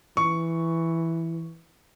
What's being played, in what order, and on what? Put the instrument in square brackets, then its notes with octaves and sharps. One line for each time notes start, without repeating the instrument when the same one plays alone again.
[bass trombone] E3 [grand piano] C#6